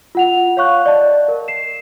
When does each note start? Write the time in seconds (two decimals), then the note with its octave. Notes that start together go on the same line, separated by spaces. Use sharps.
0.15 F4 F#5 F7
0.57 C#5 F5 C#6 F#6
0.86 D5 D#5 A5
1.28 A#4
1.48 C7 E7